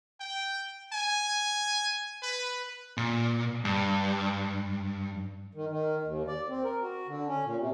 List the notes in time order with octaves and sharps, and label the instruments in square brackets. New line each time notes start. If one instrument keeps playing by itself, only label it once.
[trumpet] G5
G#5
B4
[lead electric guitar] A#2
G2
[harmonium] D#3
D#3
D#2
D5
C4
A#4
F#4
D3
C#4
A#2
C3